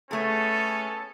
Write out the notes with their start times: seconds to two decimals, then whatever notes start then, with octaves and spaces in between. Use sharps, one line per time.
0.11 A3 B3 C#4 G#4 A4